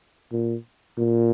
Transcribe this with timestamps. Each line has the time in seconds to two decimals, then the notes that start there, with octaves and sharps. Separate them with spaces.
0.32 A#2
0.98 A#2